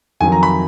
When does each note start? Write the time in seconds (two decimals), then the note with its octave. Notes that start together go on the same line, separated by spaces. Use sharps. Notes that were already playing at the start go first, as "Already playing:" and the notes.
0.21 F2 D#3 F#3 G#5
0.32 A#5
0.43 B5